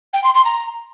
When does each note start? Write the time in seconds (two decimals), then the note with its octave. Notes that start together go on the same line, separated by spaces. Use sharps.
0.13 G5
0.24 C6
0.34 C6
0.45 A#5